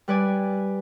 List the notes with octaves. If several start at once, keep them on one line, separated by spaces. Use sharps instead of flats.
G3 B4 D5 G#5